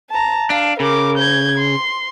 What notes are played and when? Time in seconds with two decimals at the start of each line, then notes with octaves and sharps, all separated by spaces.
0.10 A5 A#5
0.50 D4 F5
0.80 C#3 A#4 D6
1.18 G6 G#6
1.58 C6